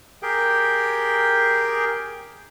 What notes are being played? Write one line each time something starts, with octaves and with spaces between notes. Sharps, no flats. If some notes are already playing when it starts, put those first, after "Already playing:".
G4 G#4 A#4 G5